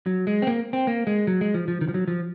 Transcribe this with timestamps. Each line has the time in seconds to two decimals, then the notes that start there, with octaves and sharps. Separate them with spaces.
0.06 F#3
0.27 G#3
0.42 C4
0.47 A#3
0.73 C4
0.87 A#3
1.07 G#3
1.27 F#3
1.41 G#3
1.54 F3
1.68 F3
1.81 D#3
1.88 F3
1.94 F#3
2.08 F3